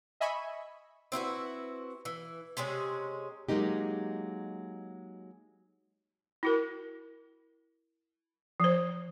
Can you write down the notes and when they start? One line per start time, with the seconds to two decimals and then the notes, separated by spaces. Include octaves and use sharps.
0.20 D#5 E5 G#5 B5 C#6
1.12 C4 E4 F#4 B4
2.05 E3
2.57 C3 G#3 C#4 G#4
3.49 F#3 G#3 A#3 D#4 G4
6.43 E4 F#4 A#4
8.60 F3 C5